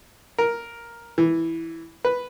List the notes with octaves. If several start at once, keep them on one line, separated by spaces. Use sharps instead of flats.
A#4
E3
B4